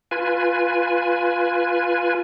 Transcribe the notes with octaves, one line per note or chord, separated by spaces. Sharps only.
F4 B4 G#5